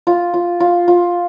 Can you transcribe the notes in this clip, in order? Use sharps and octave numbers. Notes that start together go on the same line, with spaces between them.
F4
F4
F4
F4